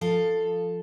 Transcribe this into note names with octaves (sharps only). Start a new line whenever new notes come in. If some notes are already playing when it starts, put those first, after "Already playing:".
F3 A4 F5